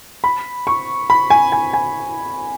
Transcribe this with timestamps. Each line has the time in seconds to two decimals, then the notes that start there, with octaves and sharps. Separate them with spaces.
0.24 B5
0.67 C#6
1.10 B5
1.30 G#5
1.52 G#5
1.73 G#5